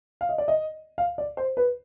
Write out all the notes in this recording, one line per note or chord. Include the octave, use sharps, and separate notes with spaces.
F5
D#5
D5
D#5
F5
D5
C5
B4